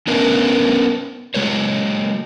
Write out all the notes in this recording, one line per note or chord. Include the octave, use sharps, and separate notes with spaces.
B3 C#4 D4 A#4 B4 E5
F#3 G#3 C5 C#5